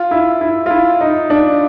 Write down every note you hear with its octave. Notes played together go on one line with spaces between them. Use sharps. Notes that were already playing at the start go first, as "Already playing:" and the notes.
Already playing: F4
E4
E4
F4
E4
D#4
D4